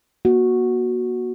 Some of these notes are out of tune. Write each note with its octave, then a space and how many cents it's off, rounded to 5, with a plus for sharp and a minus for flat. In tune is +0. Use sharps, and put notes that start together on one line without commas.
A#3 +40 F#4 -5